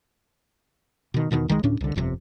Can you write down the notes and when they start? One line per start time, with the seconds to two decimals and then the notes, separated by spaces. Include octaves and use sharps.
1.14 B2 D#3
1.31 E2 B2 D3 D#3
1.48 C2 D#3 F3 G#3
1.63 D2 A2 C#4 D4
1.81 C2 D3
1.96 G1 F2 A2 C3